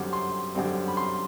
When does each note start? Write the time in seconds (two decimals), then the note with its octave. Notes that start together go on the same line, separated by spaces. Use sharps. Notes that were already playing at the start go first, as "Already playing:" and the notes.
Already playing: F#2 D3 G3 C4 D6
0.13 C6
0.55 F#2 D3 G3 C4
0.88 B5
0.97 C6